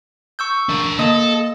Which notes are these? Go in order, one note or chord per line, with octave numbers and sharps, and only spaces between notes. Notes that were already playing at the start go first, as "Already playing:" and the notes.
C#6 E6 G6
D4 A#4
A#3 A4 D#5 D#6